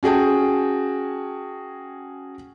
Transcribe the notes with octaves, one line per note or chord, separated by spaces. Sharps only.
C#4 F#4 G#4 G5 A5